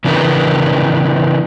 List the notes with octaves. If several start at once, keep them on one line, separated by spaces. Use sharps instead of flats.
C#3 E3 B3 D4 A#4 B4